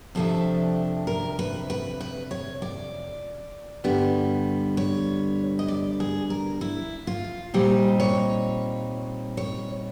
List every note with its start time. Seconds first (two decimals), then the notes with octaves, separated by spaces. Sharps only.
0.15 F2 C3 F3 A3 D4 A4
1.07 A#4
1.39 B4
1.70 B4
2.00 B4
2.31 C#5
2.62 D5
3.84 G2 D3 G3 B3
4.77 C#5
5.59 D#5
5.68 D5
6.00 G#4
6.30 A#4
6.61 E4
7.07 F4
7.54 A#2 G3 C4 D#4 G4
8.00 C#5
9.37 C#5